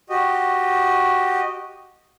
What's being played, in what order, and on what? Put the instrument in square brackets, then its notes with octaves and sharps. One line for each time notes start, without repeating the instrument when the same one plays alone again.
[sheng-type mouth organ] F#4 G4 D#5